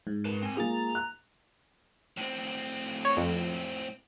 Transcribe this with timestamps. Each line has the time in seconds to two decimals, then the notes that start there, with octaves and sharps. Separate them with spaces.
0.07 G#2
0.25 A#4 B4 A5
0.43 C4 G#5
0.57 G#3 A#3 F4 G#4 A#5 A6
0.95 F#6
2.17 A2 C4
3.05 C#5
3.17 F2